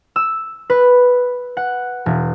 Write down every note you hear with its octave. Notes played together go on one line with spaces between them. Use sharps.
E6
B4
F#5
E1